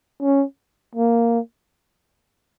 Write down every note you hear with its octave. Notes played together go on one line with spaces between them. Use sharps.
C#4
A#3